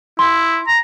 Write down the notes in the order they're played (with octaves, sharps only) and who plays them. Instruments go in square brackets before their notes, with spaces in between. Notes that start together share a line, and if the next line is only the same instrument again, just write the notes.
[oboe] E4 [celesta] C6
[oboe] A#5